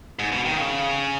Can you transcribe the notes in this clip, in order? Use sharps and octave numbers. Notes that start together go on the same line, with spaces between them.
G#2
B2
D#3
C#3